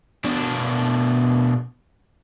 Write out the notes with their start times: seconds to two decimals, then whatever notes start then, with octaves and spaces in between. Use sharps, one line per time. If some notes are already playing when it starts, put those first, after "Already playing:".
0.25 B2 D4